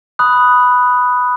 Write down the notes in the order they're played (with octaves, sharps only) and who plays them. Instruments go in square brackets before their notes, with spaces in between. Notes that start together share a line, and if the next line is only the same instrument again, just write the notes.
[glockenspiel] B5 D#6 F#6